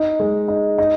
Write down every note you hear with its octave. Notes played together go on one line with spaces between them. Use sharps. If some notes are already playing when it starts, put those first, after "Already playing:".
Already playing: D#4
G#3
D#4
D#4